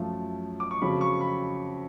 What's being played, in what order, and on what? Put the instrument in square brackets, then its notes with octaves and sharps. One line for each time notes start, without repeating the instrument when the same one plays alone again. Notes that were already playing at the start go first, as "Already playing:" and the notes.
Already playing: [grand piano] F#2 F3 A3
D6
C#6
F2 C#3 F#3 B5
C#6
B5